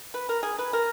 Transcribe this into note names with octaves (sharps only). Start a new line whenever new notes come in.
B4
A#4
G#4
B4
A#4